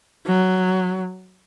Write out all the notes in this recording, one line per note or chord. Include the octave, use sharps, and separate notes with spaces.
F#3